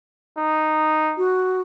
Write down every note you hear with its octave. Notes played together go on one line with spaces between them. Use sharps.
D#4
F#4